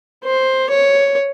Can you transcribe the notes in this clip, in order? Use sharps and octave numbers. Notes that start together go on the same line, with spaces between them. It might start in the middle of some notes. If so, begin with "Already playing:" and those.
C5
C#5